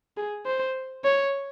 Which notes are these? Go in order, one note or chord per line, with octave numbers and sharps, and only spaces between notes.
G#4
C5
C#5